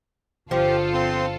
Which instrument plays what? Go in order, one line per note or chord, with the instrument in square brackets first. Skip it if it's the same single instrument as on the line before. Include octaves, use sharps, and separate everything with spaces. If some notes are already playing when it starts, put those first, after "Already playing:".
[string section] G1 F4 A4 [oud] F3 [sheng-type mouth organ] G4
[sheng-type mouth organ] C4 C6